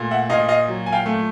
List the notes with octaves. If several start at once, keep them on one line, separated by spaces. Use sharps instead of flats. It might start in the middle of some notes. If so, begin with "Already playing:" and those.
Already playing: A#2 A3
E5 F#5
A#2 D#5 F5
D#5 F5
F#3
G#5
F5 G5
A3